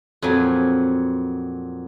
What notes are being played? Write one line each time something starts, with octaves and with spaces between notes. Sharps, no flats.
F2 A#2 F#3 G#5